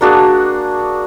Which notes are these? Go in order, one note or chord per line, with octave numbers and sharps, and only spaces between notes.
A#3 D4 F#4 G#4